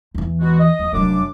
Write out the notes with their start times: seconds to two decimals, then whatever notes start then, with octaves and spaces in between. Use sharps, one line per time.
0.15 E2 E3
0.40 B2 G#3 F#4
0.60 D#5
0.79 D#2 F3
0.93 F1 F#2 F#3 D4 D6